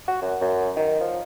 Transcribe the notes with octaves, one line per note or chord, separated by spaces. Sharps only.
F#4
F#2
F#2
D#3
F3